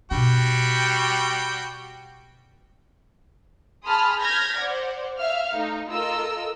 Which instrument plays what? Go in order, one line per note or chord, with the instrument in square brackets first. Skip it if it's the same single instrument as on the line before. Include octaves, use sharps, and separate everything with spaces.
[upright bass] B2 D4 [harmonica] G3 F#4 G5
[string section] G#4 A5 B5 C6 D#6 F6
F6 G6 G#6 A#6 B6
C5 D5 F#5
E5 F5 F6
A3 D#4
F4 A4 A#4 D#5 E6